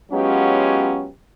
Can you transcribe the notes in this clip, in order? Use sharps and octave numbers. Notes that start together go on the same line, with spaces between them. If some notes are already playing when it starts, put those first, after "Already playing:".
F#3 G#3 B3 C#4 F4 G4